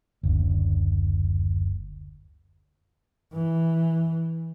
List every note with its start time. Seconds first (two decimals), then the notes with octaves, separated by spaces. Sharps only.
0.23 F#1 D2
3.33 E3